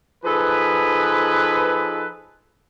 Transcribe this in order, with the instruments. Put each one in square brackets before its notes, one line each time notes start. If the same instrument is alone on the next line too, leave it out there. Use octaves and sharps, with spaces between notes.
[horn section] F3 D#4 G#4 A4 B4